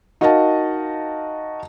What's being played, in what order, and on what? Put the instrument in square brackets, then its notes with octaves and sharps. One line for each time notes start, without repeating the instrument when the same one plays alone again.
[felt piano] D#4 F#4 A#4 D#5 F5 A5